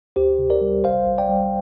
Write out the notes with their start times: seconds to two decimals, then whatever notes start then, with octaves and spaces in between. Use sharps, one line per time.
0.16 D2 G4 C5
0.39 C3
0.50 A#4 D5
0.61 G3
0.84 A#1 C5 F5
1.06 A#1
1.18 D5 G5
1.29 G3